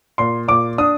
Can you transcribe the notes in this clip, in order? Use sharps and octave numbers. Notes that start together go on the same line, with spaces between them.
A#2 C6
A#2 D6
D4 D#6